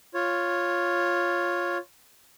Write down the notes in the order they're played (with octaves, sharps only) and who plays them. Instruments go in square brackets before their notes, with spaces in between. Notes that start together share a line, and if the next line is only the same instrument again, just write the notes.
[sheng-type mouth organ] F4 C#5